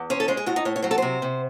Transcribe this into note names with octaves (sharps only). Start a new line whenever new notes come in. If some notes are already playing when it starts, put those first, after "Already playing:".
Already playing: E2
C#4 C5
A4
G#3 C5
G#4
A2 F#4
D#4
A2 C#5
C#5
F#3 C5
A4
C3 C5
C3